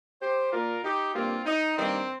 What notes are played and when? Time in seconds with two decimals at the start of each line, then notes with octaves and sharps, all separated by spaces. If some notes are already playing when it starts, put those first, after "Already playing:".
0.21 G4 C5
0.52 A#2 A#3 F4 A#4
0.84 D#4 G4
1.15 G2 G3 A#3 C4 F4
1.46 D#4
1.77 G2 D#3 G3 A#3 C4